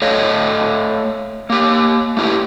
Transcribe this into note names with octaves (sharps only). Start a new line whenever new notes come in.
A3 A4 C#5 D#5 F5
A#3 G4
A3 E4 G4